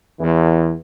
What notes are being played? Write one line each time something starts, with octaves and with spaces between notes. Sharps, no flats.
E2 E3